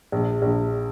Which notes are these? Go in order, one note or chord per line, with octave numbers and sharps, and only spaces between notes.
A#1
A#1